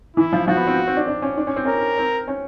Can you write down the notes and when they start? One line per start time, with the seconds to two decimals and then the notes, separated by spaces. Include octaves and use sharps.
0.17 E3 E4
0.33 F3
0.47 F3 F#4
0.56 B3
0.67 C4
0.87 C4
0.97 D4
1.07 D4
1.22 C#4
1.38 D4
1.47 C#4
1.56 C4
1.65 C#4 A#4
1.98 C4
2.28 C#4